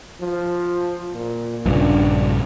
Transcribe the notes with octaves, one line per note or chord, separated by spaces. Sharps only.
F3
A#2
A#1 G2 C#3 D4